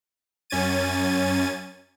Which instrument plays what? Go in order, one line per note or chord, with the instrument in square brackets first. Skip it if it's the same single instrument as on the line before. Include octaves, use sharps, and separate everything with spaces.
[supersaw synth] F#2 C#4 G#6 A6 D#7